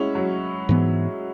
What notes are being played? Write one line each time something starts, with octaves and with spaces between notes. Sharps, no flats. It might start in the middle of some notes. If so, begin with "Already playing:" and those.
Already playing: G#3 C#4 E4 F#4
F#3
G#2 E3 B3